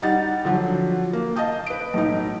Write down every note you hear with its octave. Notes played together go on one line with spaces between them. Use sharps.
G3 D#4 F#5 A6
D3 F3 F#3
A#3
D#5 F5 A5 D#6 G6
B4 D7
B1 A2 D#4